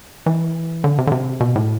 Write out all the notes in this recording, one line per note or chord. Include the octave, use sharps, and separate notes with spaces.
E3
D3
C3
D3
C3
B2
A2